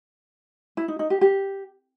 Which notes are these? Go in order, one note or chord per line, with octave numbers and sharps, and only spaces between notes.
E4
D#4
D#4
G4
G4